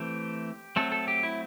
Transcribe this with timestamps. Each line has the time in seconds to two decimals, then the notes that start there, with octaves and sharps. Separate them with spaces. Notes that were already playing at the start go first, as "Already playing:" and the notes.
Already playing: E3 A3 C4 G4
0.76 F#3 A3 C4 A4
0.92 A4
1.08 G4
1.23 E4